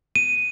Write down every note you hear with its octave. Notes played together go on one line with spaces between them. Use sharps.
D#7